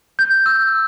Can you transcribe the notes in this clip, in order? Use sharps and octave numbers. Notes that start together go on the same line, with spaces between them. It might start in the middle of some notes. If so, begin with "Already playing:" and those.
G6
E6